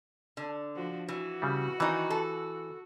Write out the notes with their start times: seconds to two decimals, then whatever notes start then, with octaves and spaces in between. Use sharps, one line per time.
0.37 D3
0.76 F3 D4 F#4
1.08 E3 F#4
1.42 C#3 G3
1.80 D#3 E3 D#4
2.10 A4